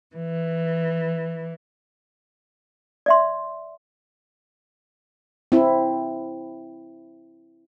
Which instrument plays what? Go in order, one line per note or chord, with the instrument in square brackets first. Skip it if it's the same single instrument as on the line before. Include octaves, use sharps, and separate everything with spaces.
[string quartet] E3
[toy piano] D5 E5 C6
[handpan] C4 E4